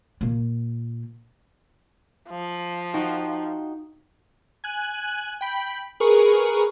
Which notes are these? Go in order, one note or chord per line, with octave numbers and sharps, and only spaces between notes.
A#2 A#3
F3
D#4 F#4 G5
G#5 F#6
G5 B5
G#4 A#4 B4 C#6